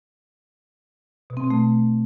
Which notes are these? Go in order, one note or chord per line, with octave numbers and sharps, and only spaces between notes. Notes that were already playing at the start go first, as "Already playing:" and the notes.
B2
C4
B2
A3